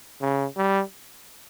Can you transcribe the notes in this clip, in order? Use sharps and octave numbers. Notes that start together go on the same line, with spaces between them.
C#3
G3